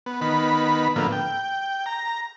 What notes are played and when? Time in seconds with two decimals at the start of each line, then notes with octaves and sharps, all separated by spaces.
0.06 B3
0.21 D#3 B3 B5
0.96 A2 D3 F3 A#3 B3
1.12 G5
1.86 A#5